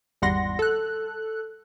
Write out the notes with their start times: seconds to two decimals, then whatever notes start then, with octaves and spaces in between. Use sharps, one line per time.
0.22 G#1 E2 G3 F#5 C6 A#6
0.59 A4 F#6